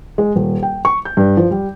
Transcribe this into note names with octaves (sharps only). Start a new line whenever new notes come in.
G#3
D#1
G5
C#6
G6
G2
F3
G3